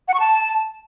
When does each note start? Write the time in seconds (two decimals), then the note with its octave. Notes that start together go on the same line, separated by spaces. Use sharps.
0.08 F#5
0.14 C#6
0.20 A5